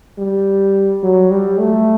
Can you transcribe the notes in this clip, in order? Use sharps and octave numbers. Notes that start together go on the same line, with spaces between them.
G3
F#3
G3
A3